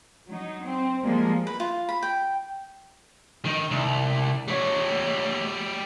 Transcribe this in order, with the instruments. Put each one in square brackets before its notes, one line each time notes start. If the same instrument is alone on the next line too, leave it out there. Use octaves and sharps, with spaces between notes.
[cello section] F#3 D#4
C4
F3 G3 G#3 A#3
[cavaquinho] B4
F4
B5
G5
[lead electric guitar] D#3
C2
G3 C#5